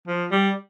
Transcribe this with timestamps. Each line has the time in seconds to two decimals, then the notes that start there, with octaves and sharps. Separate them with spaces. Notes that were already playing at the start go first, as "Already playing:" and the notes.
0.08 F3
0.32 G3